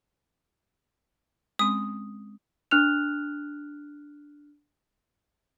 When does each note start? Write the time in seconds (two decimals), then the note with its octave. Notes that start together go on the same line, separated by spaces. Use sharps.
1.59 G#3 C4 C#4 D#6
2.71 D4 F6 F#6 F7